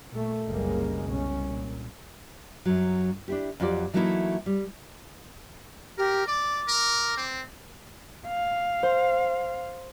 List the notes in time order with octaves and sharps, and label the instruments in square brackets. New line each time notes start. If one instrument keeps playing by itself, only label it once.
[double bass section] A#2 A3
F#1 C2 G3 G#3 A#3
C2 B2 C#4
A#2
[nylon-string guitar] F#2 F#3
D4 E4 G4
F2 F#3 F4 G4 D5
E3 F#3 A3 A#3 D#4 E4
G3
[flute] G4 [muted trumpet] A#4
[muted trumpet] D5 [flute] D6
[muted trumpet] A#4
C4
[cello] F5
[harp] C5